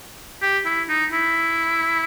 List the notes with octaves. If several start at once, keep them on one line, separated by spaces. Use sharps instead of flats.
G4
E4
D#4
E4